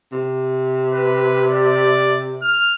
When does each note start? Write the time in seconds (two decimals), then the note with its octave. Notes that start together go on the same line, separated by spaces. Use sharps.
0.12 C3
0.93 B4
1.51 D5
2.42 F6